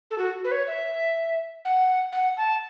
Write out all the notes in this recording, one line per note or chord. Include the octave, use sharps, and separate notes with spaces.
A4
F#4
B4
C#5
E5
F#5
F#5
A5